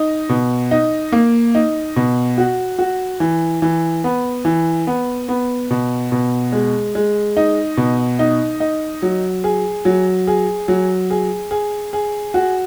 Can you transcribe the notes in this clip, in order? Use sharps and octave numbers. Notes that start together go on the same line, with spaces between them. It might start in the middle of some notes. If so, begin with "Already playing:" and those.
Already playing: D#4
B2
D#4
A#3
D#4
B2
F#4
F#4
E3
E3
B3
E3
B3
B3
B2
B2
G#3
G#3
D#4
B2
D#4
D#4
F#3
G#4
F#3
G#4
F#3
G#4
G#4
G#4
F#4